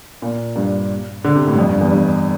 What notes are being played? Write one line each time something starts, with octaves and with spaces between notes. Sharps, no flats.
A#2
G2
D3
C3
A2
G2
F2
G2
E2
G2